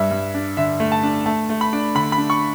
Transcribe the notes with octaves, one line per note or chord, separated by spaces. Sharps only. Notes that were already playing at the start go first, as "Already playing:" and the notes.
Already playing: G2 E5
G2
D4
D3 E5
A3
A5
D4
A3 A5
A3
B5
D4
D3 B5
B5
D4
C#6